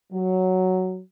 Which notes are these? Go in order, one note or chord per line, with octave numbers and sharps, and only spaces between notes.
F#3